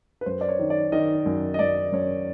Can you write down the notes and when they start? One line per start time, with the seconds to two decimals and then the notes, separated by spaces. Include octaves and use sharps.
0.21 B4
0.26 F#2 C5
0.41 D5
0.49 C#5
0.59 D#3
0.70 D5
0.92 D#3 D#5
1.26 F#2
1.54 D#5
1.59 F#2 D5
1.92 F#2 C#5